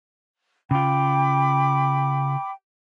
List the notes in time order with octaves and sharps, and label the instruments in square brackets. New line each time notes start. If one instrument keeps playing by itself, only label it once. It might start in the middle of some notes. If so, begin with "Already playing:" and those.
[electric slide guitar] C#3 F4 [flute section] G5 B5 D6